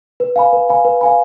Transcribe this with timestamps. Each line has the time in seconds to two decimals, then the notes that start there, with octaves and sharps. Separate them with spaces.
0.20 B4
0.36 F5 G#5 B5
0.53 B4
0.69 F5 G#5 B5
0.85 B4
1.01 F5 G#5 B5